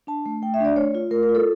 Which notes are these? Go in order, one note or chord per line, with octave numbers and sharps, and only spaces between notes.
D4 A5
A3
A3 G5
E5
D4 D5
A3 C#5
F4
A3 A#4
A#4
F4
A4